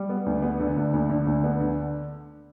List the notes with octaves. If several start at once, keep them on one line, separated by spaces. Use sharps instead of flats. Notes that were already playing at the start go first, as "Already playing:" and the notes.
Already playing: G3
B3
D2
B3
D3
D2
D2
D3
D2
B3
D3